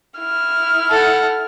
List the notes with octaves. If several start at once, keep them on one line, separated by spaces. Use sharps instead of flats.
E4 F6
A4 F#5